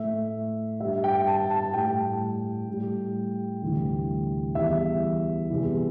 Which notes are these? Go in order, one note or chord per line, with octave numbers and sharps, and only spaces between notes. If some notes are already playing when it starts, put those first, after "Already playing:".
Already playing: A2 A3 E5
G2 G3 E5
G5
A5
A5
A2 G3 G5
A2 G3
D2 C3 E3 G3
E2 E3 G3 E5
E2 C3 E3 G3